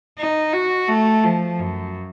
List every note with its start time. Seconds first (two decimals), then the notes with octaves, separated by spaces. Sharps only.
0.18 D#4
0.53 F#4
0.88 A3
1.24 F3
1.59 F#2